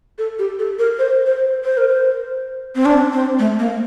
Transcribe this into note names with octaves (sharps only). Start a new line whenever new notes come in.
A4
G4
A4
A#4
C5
C5
C5
A#4
C5
C4
D4
C4
A3
A#3